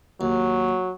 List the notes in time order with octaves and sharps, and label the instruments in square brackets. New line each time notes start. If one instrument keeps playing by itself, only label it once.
[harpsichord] D#2 [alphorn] F#3